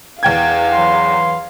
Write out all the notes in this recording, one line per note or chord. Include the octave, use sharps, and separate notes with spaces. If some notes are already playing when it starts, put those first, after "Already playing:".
E2 F5 G5 G#6
E3 F#3 C6